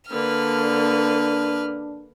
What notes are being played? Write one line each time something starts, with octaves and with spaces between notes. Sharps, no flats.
D3 A#3 D4 B4 F6